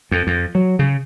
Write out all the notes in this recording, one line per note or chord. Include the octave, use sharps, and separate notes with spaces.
F2
F2
F#3
C#3